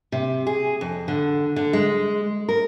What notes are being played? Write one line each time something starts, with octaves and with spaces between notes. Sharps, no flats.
C3
G#4
F2
D3
D3
G#3
A#4